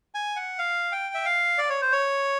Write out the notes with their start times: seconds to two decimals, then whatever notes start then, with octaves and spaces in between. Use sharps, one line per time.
0.15 G#5
0.36 F#5
0.58 F5
0.92 G5
1.14 E5
1.25 F5
1.58 D5
1.70 C#5
1.81 C5
1.92 C#5